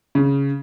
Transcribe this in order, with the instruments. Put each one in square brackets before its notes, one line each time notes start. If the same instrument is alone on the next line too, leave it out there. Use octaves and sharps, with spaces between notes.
[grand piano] C#3